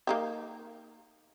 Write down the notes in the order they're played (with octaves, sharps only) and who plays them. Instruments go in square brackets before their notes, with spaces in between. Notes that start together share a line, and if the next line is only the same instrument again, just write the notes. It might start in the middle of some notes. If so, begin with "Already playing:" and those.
[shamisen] A#3 D#4 G4